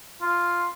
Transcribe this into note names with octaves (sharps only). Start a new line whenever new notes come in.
F4